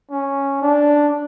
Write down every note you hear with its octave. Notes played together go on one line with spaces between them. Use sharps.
C#4
D4